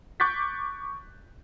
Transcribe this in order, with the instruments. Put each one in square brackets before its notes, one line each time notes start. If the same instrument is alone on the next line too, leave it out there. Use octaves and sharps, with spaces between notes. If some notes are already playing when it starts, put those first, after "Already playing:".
[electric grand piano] C#6 D6 F#6 G6 A6 B6